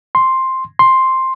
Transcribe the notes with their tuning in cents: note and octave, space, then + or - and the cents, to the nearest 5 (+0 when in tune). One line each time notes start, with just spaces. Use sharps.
C6 +5
C6 +5